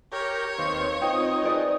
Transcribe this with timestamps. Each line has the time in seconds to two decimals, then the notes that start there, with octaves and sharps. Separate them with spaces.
0.13 G4 A#4 C#5
0.58 D#2 C4 B4 F5
1.02 C4 D#4 F4 C5 G5
1.43 G#4 B4 C5 D5